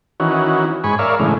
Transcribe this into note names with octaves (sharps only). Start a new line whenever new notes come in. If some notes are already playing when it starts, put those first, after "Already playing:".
D#3 E3 C#4 F#4
G#2 G#5 B5 C#6
A#4 C#5 D5 E5 F5
A2 C#3 E3 G#3